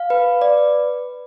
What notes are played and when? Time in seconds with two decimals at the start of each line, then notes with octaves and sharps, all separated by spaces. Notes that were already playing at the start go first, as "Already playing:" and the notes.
Already playing: F5
0.10 B4
0.42 D5